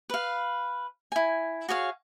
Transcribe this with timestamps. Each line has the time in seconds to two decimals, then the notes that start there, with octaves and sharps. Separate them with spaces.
0.10 B4 F5
1.12 E4 G#5
1.69 F#4 G#4 C#5 F5